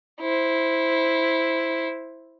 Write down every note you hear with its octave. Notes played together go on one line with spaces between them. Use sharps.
E4 C5